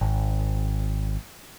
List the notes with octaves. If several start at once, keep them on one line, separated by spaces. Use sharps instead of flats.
G#1